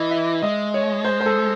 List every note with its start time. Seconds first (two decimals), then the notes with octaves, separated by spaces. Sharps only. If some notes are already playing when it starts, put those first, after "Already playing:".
Already playing: E3 D#5
0.11 E5
0.42 G#3 D#5
0.74 C#5
1.04 C5
1.20 C5
1.26 A4